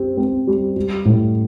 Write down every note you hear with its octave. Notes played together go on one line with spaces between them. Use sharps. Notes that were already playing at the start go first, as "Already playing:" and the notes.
Already playing: C4 G4
C4
G3
G3
A2